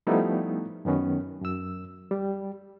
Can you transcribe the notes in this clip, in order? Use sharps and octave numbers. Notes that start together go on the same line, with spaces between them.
F3 G3 A3 B3 D#4 E4
F#2 D#3 B3 C#4
F#2 E6
G3